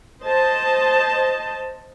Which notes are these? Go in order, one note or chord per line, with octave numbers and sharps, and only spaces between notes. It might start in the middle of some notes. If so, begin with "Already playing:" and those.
C5 D#5 A5